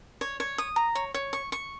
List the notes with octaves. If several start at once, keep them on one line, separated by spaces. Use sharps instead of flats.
C#5
C#5
D#6
A#5
C#5
C#5
C#6
C#6